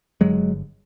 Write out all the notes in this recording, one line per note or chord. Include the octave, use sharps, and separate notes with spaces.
G1 G2 D3 F#3 G#3